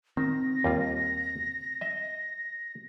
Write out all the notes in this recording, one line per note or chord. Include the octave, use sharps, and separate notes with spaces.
D#3 C4 A#6
D#2 G3 F4
D#5 E5